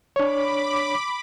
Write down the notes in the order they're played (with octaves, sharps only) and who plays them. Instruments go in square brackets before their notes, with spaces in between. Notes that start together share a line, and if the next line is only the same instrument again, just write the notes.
[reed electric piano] D4 C#5 [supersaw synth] B5 D6